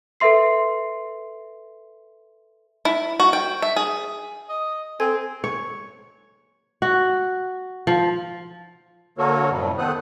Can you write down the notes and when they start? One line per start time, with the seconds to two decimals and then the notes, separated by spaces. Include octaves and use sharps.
0.20 A4 B4 E5 C6 C7
2.85 E4
3.20 F#4
3.33 G5
3.62 E5
3.76 G#4
4.49 D#5
5.00 C4 A4 G#5 G#6
5.44 C#5
6.82 F#4
7.87 F3
9.18 D3 A#3 F#4 A4 A#4 C#5
9.50 F#2 A2 C3 F3 G3
9.78 D#3 B3 A4 C5 D#6 F#6